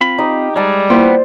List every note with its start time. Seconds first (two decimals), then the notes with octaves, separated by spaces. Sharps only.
0.01 C4 F4 B5
0.18 D#4 G4 D#5
0.56 G3 G#3 D5 A5
0.90 A#3 B3 E4 F4 B4 C5 G5